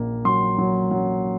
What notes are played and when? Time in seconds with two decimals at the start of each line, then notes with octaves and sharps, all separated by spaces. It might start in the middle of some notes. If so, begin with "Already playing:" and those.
Already playing: A#1 A#3
0.25 F#3 C6
0.58 F#3
0.91 F#3